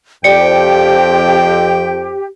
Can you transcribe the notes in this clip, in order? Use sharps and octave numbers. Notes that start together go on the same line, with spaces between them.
F2 G4 C5 D5 G5 C#7